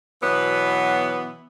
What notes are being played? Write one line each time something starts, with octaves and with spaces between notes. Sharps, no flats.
B2 E3 F#3 B3